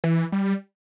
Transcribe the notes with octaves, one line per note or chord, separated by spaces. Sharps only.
E3
G3